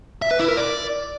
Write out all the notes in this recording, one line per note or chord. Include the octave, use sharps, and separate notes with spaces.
E5
B4
E4
A#4
D5